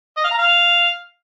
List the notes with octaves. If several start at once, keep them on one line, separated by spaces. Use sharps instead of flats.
D#5
F5
A#5
F5